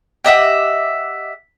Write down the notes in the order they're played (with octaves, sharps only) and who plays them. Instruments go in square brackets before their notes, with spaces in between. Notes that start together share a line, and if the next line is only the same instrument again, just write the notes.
[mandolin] G4 D#5 E5 F#5